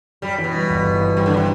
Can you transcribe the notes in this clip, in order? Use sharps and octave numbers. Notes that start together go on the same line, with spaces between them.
F#2 G3
E3
B2
G3
G1
F#2
E3
C3 G3
D3
C3